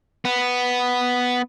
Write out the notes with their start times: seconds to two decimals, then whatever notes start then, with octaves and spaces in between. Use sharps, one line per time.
0.25 B3